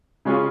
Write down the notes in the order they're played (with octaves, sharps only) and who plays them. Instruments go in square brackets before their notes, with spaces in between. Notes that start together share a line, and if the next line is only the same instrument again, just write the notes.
[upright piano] C#3 G#3 C#4 F4 G#4